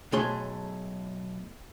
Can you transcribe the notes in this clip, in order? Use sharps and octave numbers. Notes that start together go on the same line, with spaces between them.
B1 A3 G#4 C#5 C6